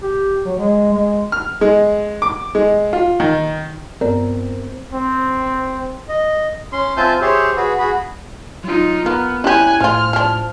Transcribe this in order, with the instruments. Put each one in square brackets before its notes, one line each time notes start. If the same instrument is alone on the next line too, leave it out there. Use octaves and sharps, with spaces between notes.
[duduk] G4
F#3
G#3
G#3
[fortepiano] F6
G#3
D6
G#3
F4
D#3
[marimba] G2 B3 D5 [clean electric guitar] C4 [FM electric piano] A#4
[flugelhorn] C4
[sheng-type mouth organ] D#5
C#4 C6
C4 F4 E5 G#5 A5 G6
G4 G#4 C5 C#5 E5
F#4 G#4 B4
F#4 G#4 B5
[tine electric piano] F#3 [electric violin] D#4 F4
[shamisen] A#3 [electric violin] B3 [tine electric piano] F6
[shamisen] G3 G4 [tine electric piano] C#4 E4 [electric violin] G#5 F#6
[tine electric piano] A2 C5 [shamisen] F3 F4 [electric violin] F6
[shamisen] F3 D4